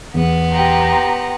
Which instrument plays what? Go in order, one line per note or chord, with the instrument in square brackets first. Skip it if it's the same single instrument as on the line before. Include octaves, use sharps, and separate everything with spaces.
[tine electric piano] E2 [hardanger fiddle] B3
[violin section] G4 A#5 C6